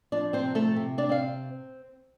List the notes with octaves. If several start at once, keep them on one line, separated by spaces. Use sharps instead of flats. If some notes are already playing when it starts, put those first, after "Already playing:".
F3 D4 D5
C4 C5
C3
A3 A4
C3
D4 D5
C4 F5